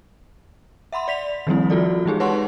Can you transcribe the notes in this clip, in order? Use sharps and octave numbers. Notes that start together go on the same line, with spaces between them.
E5 F#5 B5 C6
D5 B6 F7
D#3 F3 G3 A#3 C4 E4
F4 F#4 A4 D5
E3 G#3 D#4 G4 G#4
B4 C#5 F#5 A5 C6 C#6